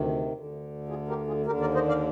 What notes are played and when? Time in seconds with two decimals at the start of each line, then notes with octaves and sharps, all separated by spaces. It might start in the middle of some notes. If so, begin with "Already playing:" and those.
Already playing: D2 C3 D#3
0.33 D2 D3
0.89 F4 G#4
1.08 G4 A#4
1.27 F4 G#4
1.46 D#2 D3 G4 A#4
1.60 A#4 D5
1.74 C5 D#5
1.88 D5 F5